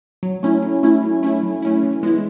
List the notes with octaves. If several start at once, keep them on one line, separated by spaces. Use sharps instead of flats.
F#3
A3 C#4 E4
F#3
A3 C#4 E4
F#3
A3 C#4 E4
F#3
A3 C#4 E4
E3
G#3 B3 E4